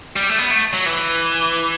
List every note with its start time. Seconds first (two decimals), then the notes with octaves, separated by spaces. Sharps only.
0.16 G3
0.31 A3
0.39 B3
0.51 A3
0.74 F#3
0.86 E3